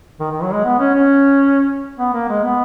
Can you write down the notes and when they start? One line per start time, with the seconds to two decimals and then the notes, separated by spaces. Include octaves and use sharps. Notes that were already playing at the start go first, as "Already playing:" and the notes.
0.20 D#3
0.31 D#3
0.42 F#3
0.53 G#3
0.65 B3
0.80 C#4
0.94 C#4
1.99 B3
2.14 A#3
2.29 G#3
2.44 B3